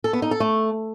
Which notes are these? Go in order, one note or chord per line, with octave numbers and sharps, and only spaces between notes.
A4
B3
D#4
A4
A3